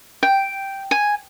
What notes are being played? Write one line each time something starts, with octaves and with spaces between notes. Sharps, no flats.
G5
G#5